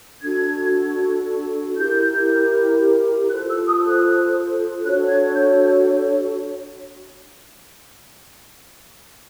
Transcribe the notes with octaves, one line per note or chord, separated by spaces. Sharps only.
D4 F#4 A4 G#6
E4 G4 A#4 G6
F4 A4 C5 F#6
E6
D#6
F#6
D4 F#4 A4 C#5 F#6
G#6
G6